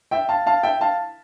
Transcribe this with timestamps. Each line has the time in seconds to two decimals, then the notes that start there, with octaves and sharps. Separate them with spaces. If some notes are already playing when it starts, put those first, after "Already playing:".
0.11 E5 G5
0.29 F5 A5
0.46 F5 A5
0.63 E5 G5
0.81 F5 A5